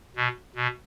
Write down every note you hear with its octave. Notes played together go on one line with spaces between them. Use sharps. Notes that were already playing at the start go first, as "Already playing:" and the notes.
B2
B2